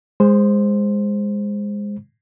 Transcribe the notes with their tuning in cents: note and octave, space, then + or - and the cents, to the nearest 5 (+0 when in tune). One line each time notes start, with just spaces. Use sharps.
G#3 -20 C5 +0